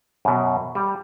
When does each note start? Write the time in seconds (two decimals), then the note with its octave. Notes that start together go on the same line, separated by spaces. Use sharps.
0.25 F#2 B2
0.75 G3